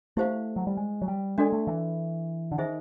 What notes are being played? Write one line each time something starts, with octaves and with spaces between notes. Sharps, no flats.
A3 E4 G4 C5 F5
F#3
G3
G#3
F#3
G3
G#3 D4 F#4 A4 D5
A3
E3
D3
D#3 D#4 G#4 C5 E5